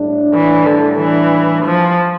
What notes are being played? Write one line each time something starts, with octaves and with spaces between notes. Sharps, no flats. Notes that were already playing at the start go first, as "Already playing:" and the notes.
Already playing: A2 G3 D4
E3
D3
E3
F3